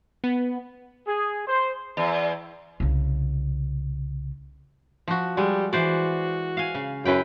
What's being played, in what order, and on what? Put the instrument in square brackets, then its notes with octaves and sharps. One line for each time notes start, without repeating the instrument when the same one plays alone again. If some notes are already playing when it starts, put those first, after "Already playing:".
[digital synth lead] B3
[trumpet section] G#4
C5
[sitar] E2
[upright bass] C2 C#3
[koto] F3 F#4
[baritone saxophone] G3 [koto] G#3
[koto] E3 C5 D5 [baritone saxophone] F#4
[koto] F5 G#5
C#3
[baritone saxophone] F#2 [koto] E4 B4 G5